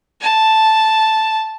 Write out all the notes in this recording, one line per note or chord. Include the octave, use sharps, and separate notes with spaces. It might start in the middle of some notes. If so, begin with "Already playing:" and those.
A5